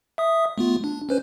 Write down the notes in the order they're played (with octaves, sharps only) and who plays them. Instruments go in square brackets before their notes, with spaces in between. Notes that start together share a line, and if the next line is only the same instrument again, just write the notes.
[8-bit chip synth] E5 D#6
A3 B3 F4
D4
C#4 B4 C5